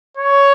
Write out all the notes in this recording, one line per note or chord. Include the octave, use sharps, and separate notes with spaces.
C#5